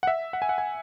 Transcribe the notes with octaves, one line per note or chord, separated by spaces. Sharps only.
F#5
E5
F#5
G#5
F#5
G#5